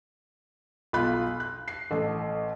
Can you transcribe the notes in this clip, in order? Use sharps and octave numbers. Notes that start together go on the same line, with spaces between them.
B1 F4 B5 F#6
F#6
C7
A1 A3